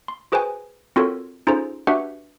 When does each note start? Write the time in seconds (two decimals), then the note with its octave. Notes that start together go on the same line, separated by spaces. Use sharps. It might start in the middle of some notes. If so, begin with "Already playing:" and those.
0.08 C6
0.32 F#4 G#4 B4 C5 G5 G#5
0.96 C4 F4 F#4 A4 A#4 C#5
1.47 C#4 D#4 F4 G#4 A4 C5
1.87 D4 F#4 G4 B4 E5 F#5